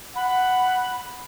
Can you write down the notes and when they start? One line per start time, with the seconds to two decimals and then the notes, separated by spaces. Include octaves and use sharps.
0.15 F#5 B5